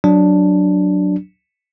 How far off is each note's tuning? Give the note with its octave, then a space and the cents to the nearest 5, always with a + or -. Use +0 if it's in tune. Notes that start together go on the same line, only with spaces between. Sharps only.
F#3 +0 D4 +0